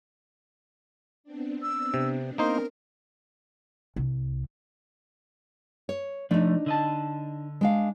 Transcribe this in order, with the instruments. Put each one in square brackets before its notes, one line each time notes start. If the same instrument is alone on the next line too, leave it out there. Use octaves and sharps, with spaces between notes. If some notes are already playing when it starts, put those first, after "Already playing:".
[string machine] B3 C4 D4
[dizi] E6
[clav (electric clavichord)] C3
[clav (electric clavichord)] A#3 D#4 C5 [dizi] A#4
[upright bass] C2
[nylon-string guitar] C#5
[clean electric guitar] F3 A3 [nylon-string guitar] D4 D#4
[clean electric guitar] D3 D#5 A5
[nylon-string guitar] G#3 D4 F5